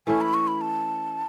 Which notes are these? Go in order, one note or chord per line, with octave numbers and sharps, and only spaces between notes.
E3 A3 C#4 E4 G#5
B5
C#6
B5
A5